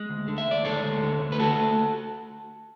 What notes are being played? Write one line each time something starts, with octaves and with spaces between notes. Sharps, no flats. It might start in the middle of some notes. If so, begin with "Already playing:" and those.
Already playing: G#3
D2
D3
E5
D2 D5
G#3 A4 C#5
D2
D3
D2
B4
A3 F#4 A4